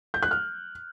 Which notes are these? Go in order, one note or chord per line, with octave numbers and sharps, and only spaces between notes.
G6
F#6
F6